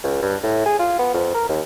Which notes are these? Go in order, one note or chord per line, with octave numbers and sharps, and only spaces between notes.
C#2
G2
A2
G#4
F4
B3
F2
A#4
D#2